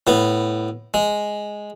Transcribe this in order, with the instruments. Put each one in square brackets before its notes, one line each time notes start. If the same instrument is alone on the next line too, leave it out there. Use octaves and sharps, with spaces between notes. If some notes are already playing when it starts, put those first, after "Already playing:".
[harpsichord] A2 B3
G#3